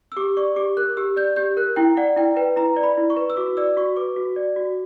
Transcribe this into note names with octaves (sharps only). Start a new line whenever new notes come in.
E6
G4 D6
D5 C#6
G4 D6
A#4 F#6
G4 E6
D5 G6
G4 G6
A#4 F#6
E4 G5
D5 F#5
E4 G5
B4 G5
E4 A#5
D5
B5
E4
C#6
B4
E6
F#4 D6
D5 E6
F#4 C#6
B4 D6
F#4
D5
F#4